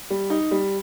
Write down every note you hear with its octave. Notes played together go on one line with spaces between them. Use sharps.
G3
D#4
G3